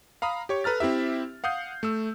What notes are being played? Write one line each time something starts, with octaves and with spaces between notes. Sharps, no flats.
F5 A#5 B5 D#6
G4 C#5 C#6
A4 B4 A#5 F6 A6
C4 E4 G4 E5
F5 F#5 D#6 G6 C7
A3 E6